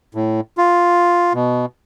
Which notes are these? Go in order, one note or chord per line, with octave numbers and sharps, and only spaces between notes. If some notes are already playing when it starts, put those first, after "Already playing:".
A2
F4
B2